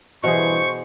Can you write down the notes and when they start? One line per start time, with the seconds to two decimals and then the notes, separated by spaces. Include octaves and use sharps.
0.24 G2 B2 E3 G#4 C5 C#6